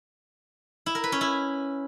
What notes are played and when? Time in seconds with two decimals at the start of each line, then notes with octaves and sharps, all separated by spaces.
0.86 E4
0.95 A#4
1.04 B4
1.12 C#4
1.21 E4